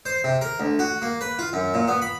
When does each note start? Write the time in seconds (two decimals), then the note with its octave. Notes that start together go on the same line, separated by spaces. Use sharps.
0.06 C5
0.24 C3
0.41 A#4
0.60 D2
0.79 F#4
1.02 A#3
1.21 B4
1.39 F4
1.53 F#2
1.74 A#2
1.88 B3
2.02 B5